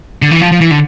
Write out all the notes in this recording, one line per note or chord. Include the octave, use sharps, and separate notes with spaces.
D3
E3
F3
F3
E3
D3